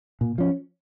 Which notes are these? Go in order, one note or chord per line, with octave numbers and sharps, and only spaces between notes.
A#2
F3 C#4